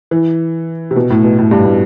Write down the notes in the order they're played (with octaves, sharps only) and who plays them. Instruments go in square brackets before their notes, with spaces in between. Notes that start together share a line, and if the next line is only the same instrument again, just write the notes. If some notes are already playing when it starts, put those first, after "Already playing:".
[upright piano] E3
C3
B2
A2
B2
A2
G2
A2